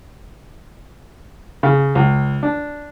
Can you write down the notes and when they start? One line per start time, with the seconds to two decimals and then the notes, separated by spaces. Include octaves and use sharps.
1.63 C#3
1.95 C#2
2.43 D4